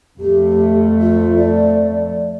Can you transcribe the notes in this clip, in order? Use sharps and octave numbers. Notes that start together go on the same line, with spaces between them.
F2 A3 G4
F4
D5